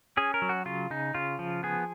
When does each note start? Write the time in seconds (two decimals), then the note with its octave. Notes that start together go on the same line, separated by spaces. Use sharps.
0.17 C#4 G#4
0.34 A#4
0.42 F#3
0.49 F#4
0.65 C#3 F4
0.90 C#3 D#4
1.15 C#3 F4
1.39 F3
1.63 B3 G#4